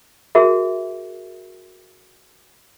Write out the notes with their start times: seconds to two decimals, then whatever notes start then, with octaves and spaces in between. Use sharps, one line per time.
0.35 F#4 G#4 A#4 E5